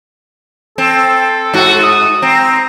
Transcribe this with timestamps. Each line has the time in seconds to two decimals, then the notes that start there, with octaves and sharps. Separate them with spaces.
0.78 C4 A4
1.54 G#2 F#4
1.83 D#6
2.22 C4 A#5